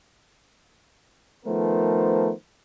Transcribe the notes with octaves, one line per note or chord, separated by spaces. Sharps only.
D#3 F3 A3 B3 A#4 C5